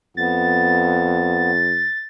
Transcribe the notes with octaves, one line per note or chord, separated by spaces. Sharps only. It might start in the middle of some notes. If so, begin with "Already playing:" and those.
F2 B3 A6